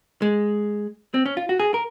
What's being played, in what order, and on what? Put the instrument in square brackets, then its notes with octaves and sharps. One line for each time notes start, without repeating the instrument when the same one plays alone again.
[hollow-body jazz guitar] G#3
C4
C#4
F4
F#4
G#4
A#4